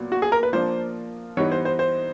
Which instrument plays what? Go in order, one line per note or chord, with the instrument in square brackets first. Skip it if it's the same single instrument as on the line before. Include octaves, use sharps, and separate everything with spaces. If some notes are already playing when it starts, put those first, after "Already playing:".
Already playing: [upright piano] A#2 F#3 B3
[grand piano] F#4
G#4
A#4
B4
[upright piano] F3 A#3 D4 F4 [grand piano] C5
[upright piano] E3 G3 B3 D#4 [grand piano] C#5
[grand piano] C5
C5
C5